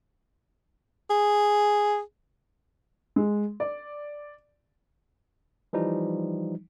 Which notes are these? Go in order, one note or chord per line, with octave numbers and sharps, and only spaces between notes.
G#4
G#3
D5
E3 F3 G3 D#4